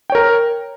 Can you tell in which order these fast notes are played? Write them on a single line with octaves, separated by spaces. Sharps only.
G5 C#5 A#4